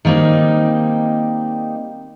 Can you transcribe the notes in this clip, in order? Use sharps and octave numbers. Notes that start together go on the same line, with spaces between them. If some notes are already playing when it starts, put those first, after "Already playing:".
D#3 G3 A#3 C4 D#4